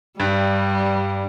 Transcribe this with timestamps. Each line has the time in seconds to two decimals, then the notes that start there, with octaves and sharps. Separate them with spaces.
0.20 G2 G3